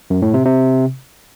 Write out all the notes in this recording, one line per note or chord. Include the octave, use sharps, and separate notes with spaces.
F#2
A2
C3
C3